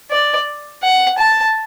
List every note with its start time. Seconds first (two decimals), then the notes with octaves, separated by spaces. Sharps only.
0.11 D5
0.82 F#5
1.18 A5